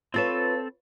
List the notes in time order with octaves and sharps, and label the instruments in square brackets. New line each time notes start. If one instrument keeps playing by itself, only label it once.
[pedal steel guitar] C4 A4 A5 [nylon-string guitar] F4 B4 C#5